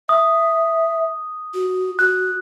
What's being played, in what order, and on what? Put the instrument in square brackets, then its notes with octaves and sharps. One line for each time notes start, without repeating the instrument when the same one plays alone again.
[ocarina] E5 [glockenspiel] D#6
[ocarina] F#4
[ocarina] F#4 [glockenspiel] F#6